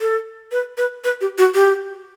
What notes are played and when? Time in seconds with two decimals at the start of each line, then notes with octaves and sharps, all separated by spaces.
0.01 A4
0.52 B4
0.78 B4
1.04 B4
1.21 G4
1.38 F#4
1.55 G4